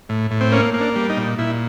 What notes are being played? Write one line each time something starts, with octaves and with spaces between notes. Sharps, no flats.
A2
A2
C4
A#3 C#4
A#3
D4
G3
D#4
A#2
A#2 E4